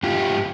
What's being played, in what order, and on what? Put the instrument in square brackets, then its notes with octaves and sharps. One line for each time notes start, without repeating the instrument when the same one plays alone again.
[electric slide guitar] G#2 F4 G4